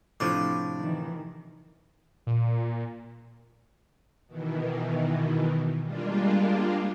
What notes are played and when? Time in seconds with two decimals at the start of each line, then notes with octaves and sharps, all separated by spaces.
0.20 A2 C3 F3 D4
0.77 D#3 E3
2.27 A#2
4.27 B2 D#3 E3
5.83 G3 G#3 A#3 D4 F4